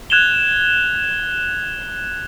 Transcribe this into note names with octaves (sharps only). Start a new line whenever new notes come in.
F#6 G#6 E7 F7 G7